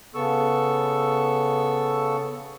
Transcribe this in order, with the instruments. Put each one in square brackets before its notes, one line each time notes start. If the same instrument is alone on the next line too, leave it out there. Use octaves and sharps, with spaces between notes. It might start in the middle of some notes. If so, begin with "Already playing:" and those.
[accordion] C#3 B3 A4 C#6 E6